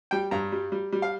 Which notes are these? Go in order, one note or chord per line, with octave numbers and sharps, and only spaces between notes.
G3 G5
G2 A#5
G3
G3
G3
F5